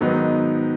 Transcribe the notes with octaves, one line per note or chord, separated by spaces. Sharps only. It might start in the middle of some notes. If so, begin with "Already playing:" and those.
G#2 D#3 F#3 B3 D#4